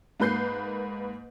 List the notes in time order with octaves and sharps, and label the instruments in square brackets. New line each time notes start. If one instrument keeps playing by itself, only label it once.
[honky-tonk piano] G#2 A#3 B4 G6 C7